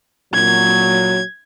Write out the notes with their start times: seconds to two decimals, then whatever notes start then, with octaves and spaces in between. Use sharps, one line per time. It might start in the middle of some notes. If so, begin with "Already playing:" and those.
0.34 A#2 F#3 G#6